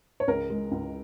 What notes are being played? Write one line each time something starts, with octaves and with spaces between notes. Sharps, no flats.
C#5
C#2 A#4
G#3
C#2